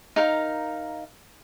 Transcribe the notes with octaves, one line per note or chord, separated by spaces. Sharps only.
D#4 A#4 F5